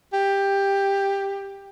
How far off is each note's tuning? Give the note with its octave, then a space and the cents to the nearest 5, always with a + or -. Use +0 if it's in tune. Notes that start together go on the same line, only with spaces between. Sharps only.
G4 +10